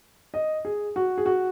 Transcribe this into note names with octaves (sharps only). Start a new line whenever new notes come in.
D#5
G#4
F#4
G#4
F#4